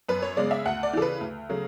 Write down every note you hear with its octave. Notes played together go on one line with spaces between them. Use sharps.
F#2 B4
C#5
C#3 G#3 B3 D5
E5
D2 F#5
D5
C#3 E3 A4
B4
D2
C#3 F#3 A3